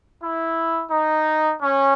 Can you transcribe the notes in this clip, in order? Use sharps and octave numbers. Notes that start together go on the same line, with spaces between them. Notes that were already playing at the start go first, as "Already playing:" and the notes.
E4
D#4
C#4